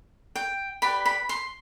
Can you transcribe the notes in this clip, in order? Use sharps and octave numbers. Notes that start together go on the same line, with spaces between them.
G5
G4 B4 D5 B5
B5
C6